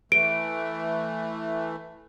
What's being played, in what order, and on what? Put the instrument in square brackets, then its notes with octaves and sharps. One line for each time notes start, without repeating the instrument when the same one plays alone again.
[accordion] E3 A3 [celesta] D7